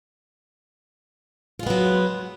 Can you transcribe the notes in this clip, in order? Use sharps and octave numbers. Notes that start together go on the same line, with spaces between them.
F#3 G#3 B3 F4